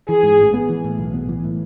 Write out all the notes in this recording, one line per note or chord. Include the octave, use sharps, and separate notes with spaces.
E3 G#4
G#2
A1
B3
E3
A2
B1
B3
E3
A2